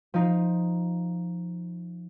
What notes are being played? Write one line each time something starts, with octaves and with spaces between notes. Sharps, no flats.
F3 D#4 C7